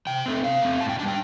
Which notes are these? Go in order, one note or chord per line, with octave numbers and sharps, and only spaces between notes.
C3 G5
A3 C4
C3 F5
A3 C4
A2 A5
G5
G3 D4 A5
G5